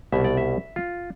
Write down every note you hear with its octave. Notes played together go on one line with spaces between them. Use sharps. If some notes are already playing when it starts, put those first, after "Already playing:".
C2 B2 E5
D5
E5
F4